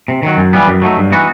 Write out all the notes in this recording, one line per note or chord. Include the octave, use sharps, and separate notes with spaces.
C3
D#3 F#3
F#2
E3 G3 B3
F#2
F#3 A3 D#4
G2
E3 B3 D#4 F#4